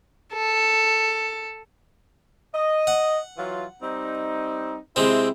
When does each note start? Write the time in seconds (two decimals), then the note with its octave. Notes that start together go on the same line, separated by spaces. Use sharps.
0.33 A4
2.55 D#5
2.87 F#5
3.37 E3 F#3 F4
3.82 G3 C4 D#4
4.96 C3 G#3 C4 E4